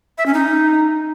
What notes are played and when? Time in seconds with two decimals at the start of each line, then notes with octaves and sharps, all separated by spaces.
0.18 E5
0.26 C#4
0.34 D#4